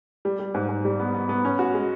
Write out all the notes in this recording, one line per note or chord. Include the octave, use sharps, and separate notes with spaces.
G3
G3
G#2
G#2
G3
B3
B3
B3
C#4
F#4
G#3